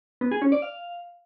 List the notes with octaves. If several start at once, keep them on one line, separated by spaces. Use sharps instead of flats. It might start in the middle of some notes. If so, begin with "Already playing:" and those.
B3
G#4
C#4
D5
F5